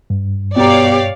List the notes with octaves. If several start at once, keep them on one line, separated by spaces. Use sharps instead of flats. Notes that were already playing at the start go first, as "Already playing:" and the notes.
G2
B2 G4 C#5 D5 F5 A#5